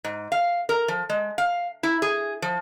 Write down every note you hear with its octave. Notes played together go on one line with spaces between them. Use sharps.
G#2
F5
A#4
F3
G#3
F5
E4
G#4
F3